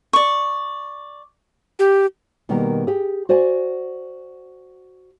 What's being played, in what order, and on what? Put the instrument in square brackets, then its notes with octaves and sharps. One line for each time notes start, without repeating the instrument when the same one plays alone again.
[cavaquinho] D5 C#6
[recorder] G4
[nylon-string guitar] B2 D#3 G3 A#3 A#4
G4 G#4
F#4 C5 D5 G#5